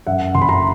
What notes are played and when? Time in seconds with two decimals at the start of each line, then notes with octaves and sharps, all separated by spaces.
0.07 F#2 E5 F#5
0.34 F#1 C6
0.42 B5
0.49 A#5 C6